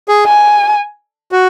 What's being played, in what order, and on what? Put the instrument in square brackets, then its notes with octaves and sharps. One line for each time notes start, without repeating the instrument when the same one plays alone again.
[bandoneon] G#4
[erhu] G#5
[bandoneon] F#4